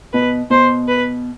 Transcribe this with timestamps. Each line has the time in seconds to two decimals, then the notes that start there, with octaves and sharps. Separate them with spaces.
0.14 B2 B4
0.50 B2 C5
0.88 B4